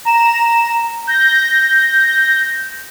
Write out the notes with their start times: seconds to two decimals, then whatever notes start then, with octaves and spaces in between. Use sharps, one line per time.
0.05 A#5 E7
1.07 G6 A#6